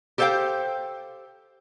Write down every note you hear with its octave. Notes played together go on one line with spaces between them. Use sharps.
G4 A4 C5 E5 F5 G5